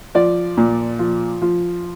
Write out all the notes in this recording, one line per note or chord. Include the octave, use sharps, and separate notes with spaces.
F3 D5
A#2
F3
F3